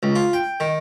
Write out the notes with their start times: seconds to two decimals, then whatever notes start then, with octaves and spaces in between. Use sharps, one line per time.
0.03 C#2
0.15 F4
0.33 G5
0.60 D#3